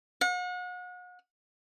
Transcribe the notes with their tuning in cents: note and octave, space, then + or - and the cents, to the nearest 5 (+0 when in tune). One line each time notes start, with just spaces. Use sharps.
F#5 -40